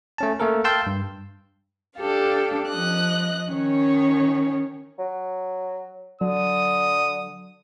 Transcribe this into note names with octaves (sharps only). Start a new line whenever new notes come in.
A3 C#4 A5
A3 A#3 A4 A#4
F5 G5 A5 C6 E6 G6
G2
D4 G4 A4 F5
F3 D#5 F#6
D#3 C#4 C#5
F#3
D3 F#3 D#6